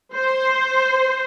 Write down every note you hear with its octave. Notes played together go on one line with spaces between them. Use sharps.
C5